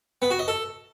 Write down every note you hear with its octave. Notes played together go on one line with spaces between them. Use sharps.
B3
F#4
D#5
A4